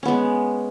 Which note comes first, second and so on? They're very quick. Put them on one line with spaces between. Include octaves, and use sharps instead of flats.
C#4 B3 G#3